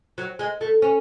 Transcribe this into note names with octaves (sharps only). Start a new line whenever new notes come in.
F#3
G#3
A3
C#4